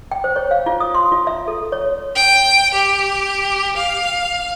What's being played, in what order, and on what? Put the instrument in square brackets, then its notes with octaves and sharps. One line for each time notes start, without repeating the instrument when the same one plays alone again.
[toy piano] G5
C5
C#5
F5
F4
D#6
C6
F4
E5
A4
C#5
[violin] G5
G4
F5